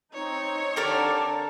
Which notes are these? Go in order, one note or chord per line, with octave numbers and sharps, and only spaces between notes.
C4 D#4 C#5
D3 G4 A#4 D5 A5